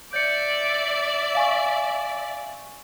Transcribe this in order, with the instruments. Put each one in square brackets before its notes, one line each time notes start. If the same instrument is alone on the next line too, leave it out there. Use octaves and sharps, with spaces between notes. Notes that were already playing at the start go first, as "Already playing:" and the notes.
[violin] D5 E5 [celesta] G6 C#7
[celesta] F5 G#5 C#6